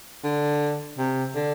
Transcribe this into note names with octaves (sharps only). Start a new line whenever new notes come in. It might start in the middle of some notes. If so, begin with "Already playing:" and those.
D3
C3
D3